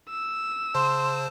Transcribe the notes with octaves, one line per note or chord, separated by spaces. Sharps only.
E6
C#3 C5 A5 C6